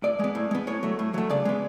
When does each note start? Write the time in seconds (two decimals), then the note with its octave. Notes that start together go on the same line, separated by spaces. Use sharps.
0.03 A2 D5
0.20 G#3 B3
0.35 A2
0.51 G#3 B3
0.67 A2 C#5
0.83 F#3 A3
0.99 A2
1.14 F#3 A3
1.30 C#3 D5
1.45 G#3 B3